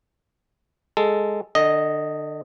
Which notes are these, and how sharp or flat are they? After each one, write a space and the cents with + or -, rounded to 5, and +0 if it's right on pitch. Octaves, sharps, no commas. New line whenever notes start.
G#3 +0 A4 +0
D3 +30 D#5 +0